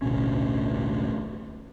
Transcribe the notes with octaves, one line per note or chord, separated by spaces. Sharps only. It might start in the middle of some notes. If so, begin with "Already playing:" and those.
A1 D2 B2 C#4